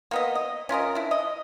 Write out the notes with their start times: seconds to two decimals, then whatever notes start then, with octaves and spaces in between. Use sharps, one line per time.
0.11 A#3 B3 D#5
0.35 D#5
0.69 C#4 F4 A#4 D#5
0.95 D4 E4
1.11 D#5